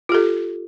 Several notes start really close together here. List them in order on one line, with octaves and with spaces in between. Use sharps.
F4 G4 A4